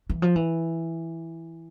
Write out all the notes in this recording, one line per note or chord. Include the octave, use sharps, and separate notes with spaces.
E3
F3
E3